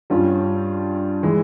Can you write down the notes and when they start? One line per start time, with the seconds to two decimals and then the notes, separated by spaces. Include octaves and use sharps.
0.10 G2 G3 C#4 F4
1.23 E3 G#3